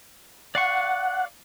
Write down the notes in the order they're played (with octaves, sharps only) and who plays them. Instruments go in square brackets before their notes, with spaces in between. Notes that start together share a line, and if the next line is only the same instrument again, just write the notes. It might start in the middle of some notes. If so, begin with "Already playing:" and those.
[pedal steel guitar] D5 F5 C#6 [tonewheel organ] F#5